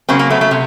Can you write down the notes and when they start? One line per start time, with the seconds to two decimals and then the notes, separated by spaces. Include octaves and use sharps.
0.09 C#3 F#3 A#3 C4
0.19 A#3
0.30 A3 B3
0.41 A3
0.51 C3